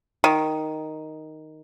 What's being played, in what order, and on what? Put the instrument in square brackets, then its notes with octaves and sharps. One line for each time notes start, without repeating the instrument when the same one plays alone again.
[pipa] D#3